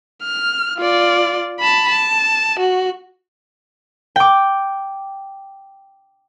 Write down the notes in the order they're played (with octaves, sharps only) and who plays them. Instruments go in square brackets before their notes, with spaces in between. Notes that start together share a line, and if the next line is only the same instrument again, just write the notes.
[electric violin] F6
F4 D5
A5 B5
A5
F#4
[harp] G5 D6